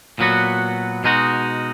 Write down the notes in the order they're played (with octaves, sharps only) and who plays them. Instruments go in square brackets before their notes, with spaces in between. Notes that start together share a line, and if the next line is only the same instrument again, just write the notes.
[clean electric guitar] A#2 F#3 B3 F#4
B2 G#3 D#4 F#4